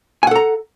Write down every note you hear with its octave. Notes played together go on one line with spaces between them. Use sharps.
A4 F#5 G#5 A#5